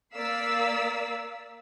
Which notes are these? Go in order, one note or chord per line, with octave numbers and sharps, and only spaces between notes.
A#3 D5 F5 E6 B6